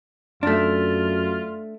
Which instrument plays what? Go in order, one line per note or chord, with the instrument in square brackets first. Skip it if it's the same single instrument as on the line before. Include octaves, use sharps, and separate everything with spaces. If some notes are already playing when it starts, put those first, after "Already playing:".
[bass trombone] F#2 [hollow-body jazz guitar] A3 D4 [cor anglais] F4